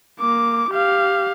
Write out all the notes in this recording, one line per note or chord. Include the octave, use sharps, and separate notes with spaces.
A#3 D6
G4 F5